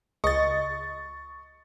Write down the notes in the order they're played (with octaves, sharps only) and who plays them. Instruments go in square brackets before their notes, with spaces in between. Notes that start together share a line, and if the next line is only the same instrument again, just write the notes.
[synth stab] C#2 D#5 [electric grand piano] C#6 A6